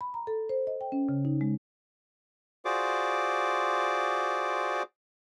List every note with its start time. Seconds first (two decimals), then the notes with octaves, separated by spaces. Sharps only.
0.01 B5
0.14 A#5
0.27 A4
0.49 C5
0.67 D#5
0.81 G5
0.92 C#4
1.09 C#3
1.25 D#4
1.41 G#3
2.65 F4 F#4 G#4 C5 D5 D6